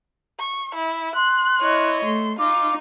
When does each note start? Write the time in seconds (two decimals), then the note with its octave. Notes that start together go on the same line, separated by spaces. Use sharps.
0.39 C#6
0.75 E4
1.15 C6 F#6
1.61 E4 C#5 D#5
2.04 A3 C6
2.39 D#4 F4 D6